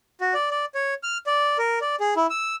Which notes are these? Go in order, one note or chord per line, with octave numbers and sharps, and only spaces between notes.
F#4
D5
D5
C#5
F6
D5
A#4
D5
G#4
E4
E6